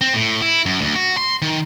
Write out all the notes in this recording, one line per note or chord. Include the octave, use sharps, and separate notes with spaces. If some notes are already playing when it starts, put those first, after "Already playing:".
C4
A2
E4
F#2
D2
F#4
C6
D#3